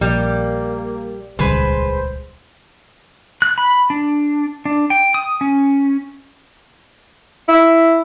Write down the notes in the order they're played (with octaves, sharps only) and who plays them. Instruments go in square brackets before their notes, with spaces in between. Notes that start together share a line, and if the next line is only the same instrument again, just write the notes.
[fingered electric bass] A#1 [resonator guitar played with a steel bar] G3 [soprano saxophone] A#3
[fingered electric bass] D#1 C#2 G3 [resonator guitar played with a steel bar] G#3 B4 [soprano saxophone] C5
[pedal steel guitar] F#6
B5
D4
D4
G5
D#6
C#4
[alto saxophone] E4